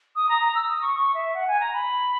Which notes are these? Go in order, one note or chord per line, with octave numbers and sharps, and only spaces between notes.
D#6
A#5
A#5
E6
D#6
C#6
C#6
E5
F#5
G#5
A#5
B5